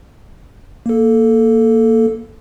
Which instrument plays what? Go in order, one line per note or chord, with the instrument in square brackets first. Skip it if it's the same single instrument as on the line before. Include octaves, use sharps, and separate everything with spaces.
[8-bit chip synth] A#3 A4